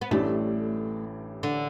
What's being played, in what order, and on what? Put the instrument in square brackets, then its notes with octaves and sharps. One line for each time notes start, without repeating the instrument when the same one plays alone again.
[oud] B3
[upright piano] A1 A2 E3 G3 D4 [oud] A3
[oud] D3